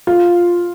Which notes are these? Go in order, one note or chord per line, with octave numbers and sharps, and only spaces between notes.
F4